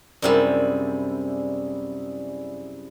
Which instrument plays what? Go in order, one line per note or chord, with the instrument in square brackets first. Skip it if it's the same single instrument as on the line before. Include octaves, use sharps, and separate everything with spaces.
[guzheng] F#2 C3 G3 [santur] D4 E4 G#4